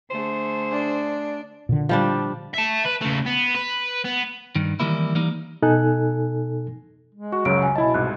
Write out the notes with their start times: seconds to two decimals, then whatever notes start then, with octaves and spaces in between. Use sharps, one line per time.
0.10 D3 A3 G#4 C5
0.71 D4
1.69 A#2 D3
1.89 F3 G3 D4
2.54 E5 A5
2.85 B4
3.01 C#3 A3
3.26 B3
3.55 B4
4.05 B3
4.56 G2 D#3
4.80 D#3 E3 G3 A#3 E4
5.15 E3 G3 A#3 D#4
5.62 B2 D#4 A4 G#5 F#6
7.15 G#3
7.32 F#4 C#6
7.45 C#2 F#2 C#3 F#3 D7
7.62 G#5
7.76 B2 E4 D#5 A5 B5
7.94 C2 G#2 F#6